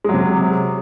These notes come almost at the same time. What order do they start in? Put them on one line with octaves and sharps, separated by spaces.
G#3 F#3 C3